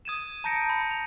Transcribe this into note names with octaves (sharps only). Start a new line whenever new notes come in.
D#6 G#6 D#7 E7
A5 A#5 G6 A#6 C#7 D7
B5
F7